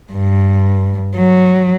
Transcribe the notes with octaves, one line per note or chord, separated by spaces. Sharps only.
G2
F#3